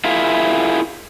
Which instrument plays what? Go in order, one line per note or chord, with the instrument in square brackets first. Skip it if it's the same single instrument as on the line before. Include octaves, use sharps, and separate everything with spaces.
[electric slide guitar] E4 F4 G#4 A#4 E5 F5